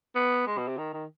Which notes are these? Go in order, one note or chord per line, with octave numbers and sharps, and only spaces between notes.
B3
G#3
B2
C3
D#3
D#3